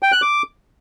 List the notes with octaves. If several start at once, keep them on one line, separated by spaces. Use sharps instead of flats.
G5
F#6
D6